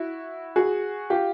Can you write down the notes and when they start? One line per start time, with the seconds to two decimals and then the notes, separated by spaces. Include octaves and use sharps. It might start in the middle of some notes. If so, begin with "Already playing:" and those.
Already playing: E4 F#4
0.56 F#4 G#4
1.10 F4 G4